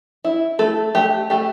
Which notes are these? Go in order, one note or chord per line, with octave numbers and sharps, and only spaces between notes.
E4
A3 A4
A3 G4
A3 G4